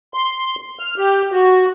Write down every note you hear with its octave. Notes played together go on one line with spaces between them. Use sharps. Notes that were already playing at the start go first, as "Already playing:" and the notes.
C6
F6
G4
F#4